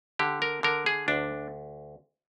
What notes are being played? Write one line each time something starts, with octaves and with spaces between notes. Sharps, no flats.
D3 G4
A#4
D3 A#4
G#4
D2 D4